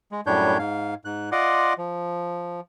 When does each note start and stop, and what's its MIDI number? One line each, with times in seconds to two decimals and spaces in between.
0.12 0.21 56
0.26 0.58 42
0.26 0.58 45
0.26 0.58 55
0.26 0.58 62
0.26 0.58 73
0.26 0.58 91
0.59 0.94 44
0.59 0.94 77
1.05 1.30 44
1.05 1.30 90
1.32 1.73 65
1.32 1.73 74
1.32 1.73 75
1.32 1.73 78
1.32 1.73 84
1.32 1.73 86
1.78 2.60 53